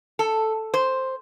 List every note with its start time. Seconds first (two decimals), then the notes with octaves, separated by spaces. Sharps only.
0.19 A4
0.74 C5